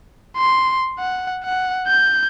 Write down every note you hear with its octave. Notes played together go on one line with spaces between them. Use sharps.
C6
F#5
F#5
G6